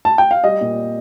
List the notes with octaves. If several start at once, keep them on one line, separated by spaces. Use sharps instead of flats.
A5
G5
F5
G3 D#5
A#2